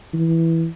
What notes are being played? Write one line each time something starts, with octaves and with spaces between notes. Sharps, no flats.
E3